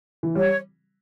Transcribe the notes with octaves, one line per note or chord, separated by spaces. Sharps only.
E3
G3 C#5